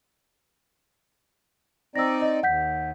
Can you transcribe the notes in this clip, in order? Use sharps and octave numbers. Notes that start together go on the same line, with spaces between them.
C4 D#4 D5 E6 A#6
D#5
D#2 F#5 G6 B6